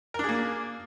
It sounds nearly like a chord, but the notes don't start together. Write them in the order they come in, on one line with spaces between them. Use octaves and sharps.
A#4 D4 G#4 A#3